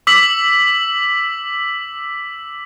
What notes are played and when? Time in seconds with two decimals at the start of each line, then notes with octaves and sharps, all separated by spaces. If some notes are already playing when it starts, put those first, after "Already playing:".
0.07 D6 E6 B6 F#7